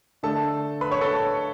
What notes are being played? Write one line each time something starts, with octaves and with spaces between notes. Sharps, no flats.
D3 A3 D4 A4 A5
B4 B5
C#5 C#6
A4 A5